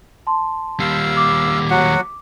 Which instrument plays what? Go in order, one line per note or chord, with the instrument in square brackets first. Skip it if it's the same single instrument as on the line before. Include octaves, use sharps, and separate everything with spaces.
[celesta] A5 C6
[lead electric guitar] D#2 G3 [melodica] F5 E6
[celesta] D6
[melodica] F#3 F#4 F#5